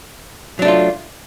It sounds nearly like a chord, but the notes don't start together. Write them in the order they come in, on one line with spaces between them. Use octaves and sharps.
F#3 D4 A3 F4